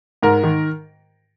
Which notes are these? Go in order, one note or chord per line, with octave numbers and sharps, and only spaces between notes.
G#2 A#4
D#3